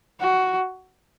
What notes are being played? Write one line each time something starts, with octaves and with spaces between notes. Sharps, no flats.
F#4